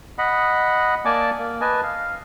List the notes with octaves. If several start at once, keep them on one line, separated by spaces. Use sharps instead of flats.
D#5 F#5 B5
A#3 D5 G#5 A5 D6
A#3
B4 D#5 G#5 A5
F5